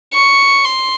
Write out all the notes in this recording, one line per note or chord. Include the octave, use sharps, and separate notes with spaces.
C#6
C6